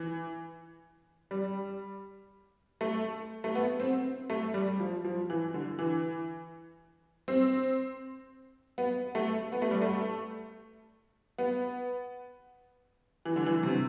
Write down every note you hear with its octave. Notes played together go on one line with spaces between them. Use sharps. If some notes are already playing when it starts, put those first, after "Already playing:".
Already playing: E3
G3
A3
A3
B3
C4
A3
G3
F3
F3
E3
D3
E3
C4
B3
A3
B3
A3
G3
A3
B3
E3
D3
E3
C3